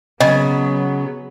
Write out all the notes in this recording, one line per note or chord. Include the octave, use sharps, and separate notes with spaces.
C#3 F#3 B3 D#5